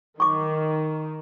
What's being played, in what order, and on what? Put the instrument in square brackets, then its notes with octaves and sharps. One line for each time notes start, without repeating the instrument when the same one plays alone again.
[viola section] D#3 [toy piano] C#6 D6